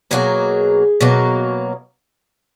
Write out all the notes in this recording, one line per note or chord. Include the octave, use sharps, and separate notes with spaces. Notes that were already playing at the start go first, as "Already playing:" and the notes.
B2 F#3 A#3 G#4
B2 F#3 A#3